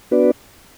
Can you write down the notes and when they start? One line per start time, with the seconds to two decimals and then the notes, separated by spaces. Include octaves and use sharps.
0.11 B3 D4 F#4 B4 D5